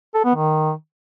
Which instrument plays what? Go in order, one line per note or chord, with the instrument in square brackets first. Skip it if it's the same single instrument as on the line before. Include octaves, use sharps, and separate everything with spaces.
[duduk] A4
B3
D#3